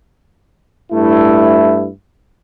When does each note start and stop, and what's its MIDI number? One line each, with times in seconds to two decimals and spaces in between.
0.93 1.89 43
0.93 1.89 57
0.93 1.89 64